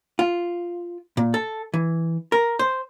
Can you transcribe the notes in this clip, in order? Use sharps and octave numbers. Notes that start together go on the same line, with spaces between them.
F4
A#2
A4
E3
A#4
C5